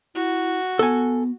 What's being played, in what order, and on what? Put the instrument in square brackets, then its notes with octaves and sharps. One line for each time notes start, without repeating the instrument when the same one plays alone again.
[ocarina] E4 [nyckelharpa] F#4
[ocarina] B3 [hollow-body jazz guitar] A4 G#5